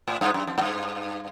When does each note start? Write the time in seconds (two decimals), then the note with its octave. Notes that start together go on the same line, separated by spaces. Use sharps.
0.07 A2
0.21 G2
0.34 F#2
0.47 F2
0.58 G#2
0.61 G2